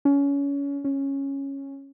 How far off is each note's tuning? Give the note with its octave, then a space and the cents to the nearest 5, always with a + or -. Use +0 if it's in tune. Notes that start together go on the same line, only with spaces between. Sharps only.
C#4 +25
C#4 -10